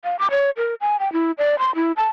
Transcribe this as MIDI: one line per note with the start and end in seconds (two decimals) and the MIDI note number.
0.04 0.16 77
0.19 0.27 86
0.31 0.50 73
0.57 0.74 70
0.81 0.97 80
1.00 1.12 79
1.13 1.31 64
1.38 1.58 74
1.59 1.75 84
1.75 1.92 64
1.97 2.09 81